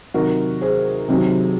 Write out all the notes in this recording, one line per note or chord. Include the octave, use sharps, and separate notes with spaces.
C3 D#3 F#3 F#4 A#4
G#4 C5
C3 D#3 F#3